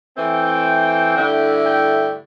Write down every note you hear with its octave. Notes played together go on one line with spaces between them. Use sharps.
E3 A3 C4 G5
G2 D3 A3 E4
G5